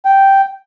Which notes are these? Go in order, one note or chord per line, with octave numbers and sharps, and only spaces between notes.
G5